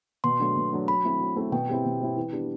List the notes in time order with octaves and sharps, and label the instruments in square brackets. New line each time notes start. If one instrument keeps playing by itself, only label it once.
[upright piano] B2 [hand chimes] C6
[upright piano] F#3 A3 D4
B2
F#3 A3 D4
[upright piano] F#3 [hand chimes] B5
[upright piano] A3 C4 E4
F#3
A3 C4 E4
[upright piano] B2 [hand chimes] G5
[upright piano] G3 C4 E4
B2
G3 C4 E4
E3
G3 B3 D4